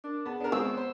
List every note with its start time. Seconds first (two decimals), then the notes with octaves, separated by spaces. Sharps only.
0.04 D4 A#4 D6
0.25 B3 G#4 A5
0.40 B3 D4 A#4
0.52 G#3 C4 E6
0.77 C5